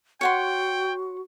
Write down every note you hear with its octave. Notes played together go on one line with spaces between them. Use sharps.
F#4 C#5 F#5 G5 C6